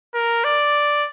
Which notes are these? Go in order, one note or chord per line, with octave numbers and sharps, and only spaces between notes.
A#4
D5